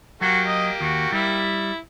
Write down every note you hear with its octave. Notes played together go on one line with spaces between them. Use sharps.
F#3 A#3 F#4 G4
D#5
D#2 F#4
G3 E4